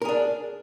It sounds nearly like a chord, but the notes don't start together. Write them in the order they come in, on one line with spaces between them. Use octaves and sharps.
A#4 G#4 D4